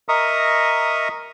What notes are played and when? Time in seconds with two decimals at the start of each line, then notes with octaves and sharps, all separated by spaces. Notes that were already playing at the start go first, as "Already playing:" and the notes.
0.09 A#4 D#5 E5 A#5 C#6 D#6